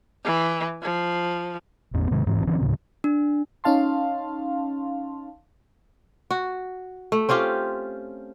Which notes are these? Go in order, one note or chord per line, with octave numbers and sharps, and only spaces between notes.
E3
F3
G#1 E2 B3 C#4
G#2 C3 D#3 G#3
D#1 G#2 E3 C4
D3 E3 C4 C#4
D2 A2 C#3
D4
C#4 D#4 F5 A5 C6
F#4
A3
C4 C#4 F4 G4